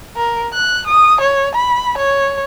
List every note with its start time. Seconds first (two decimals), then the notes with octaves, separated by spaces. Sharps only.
0.16 A#4
0.53 F#6
0.87 D#6
1.21 C#5
1.55 B5
1.98 C#5